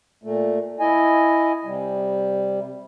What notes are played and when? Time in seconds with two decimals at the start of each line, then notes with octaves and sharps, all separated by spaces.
0.23 A#2 A3
0.80 E4 D#5 G#5
1.64 C3 G3